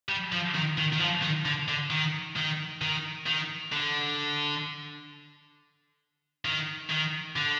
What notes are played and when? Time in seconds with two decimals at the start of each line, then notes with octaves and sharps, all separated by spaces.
0.09 G3
0.32 F3
0.55 D#3
0.78 D#3
0.93 D#3
1.00 F3
1.22 D#3
1.45 D3
1.68 D3
1.90 D#3
2.36 D#3
2.81 D#3
3.27 D#3
3.72 D3
6.45 D#3
6.90 D#3
7.36 D3